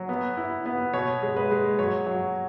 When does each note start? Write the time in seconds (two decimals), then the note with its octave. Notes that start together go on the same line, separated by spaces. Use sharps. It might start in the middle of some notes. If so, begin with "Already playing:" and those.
Already playing: F#3
0.09 B3
0.37 E4
0.66 B3
0.94 B2 C#5
1.23 G#3
1.36 B4
1.51 G#3
1.79 F#3 C#5
2.07 F#3